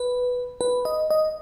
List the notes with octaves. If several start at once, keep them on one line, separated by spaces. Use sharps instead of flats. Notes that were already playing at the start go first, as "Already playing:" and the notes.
Already playing: B4
B4
D#5
D#5